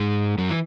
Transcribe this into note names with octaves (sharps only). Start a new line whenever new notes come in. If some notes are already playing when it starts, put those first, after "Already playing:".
Already playing: G#2 G#3
F#2 F#3
E3 E4